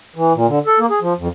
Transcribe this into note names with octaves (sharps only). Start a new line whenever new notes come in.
E3
A#2
D3
A4
A#3
G#4
F3
F2